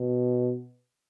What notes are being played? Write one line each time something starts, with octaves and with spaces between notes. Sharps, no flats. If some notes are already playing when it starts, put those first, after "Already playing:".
Already playing: B2